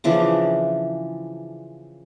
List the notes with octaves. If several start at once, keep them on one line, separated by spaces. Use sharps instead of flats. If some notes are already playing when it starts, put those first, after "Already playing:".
C#3 E3 F3 D4